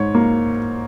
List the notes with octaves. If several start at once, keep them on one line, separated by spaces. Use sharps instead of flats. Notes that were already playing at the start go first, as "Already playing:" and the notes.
Already playing: G#2 C#5
A#3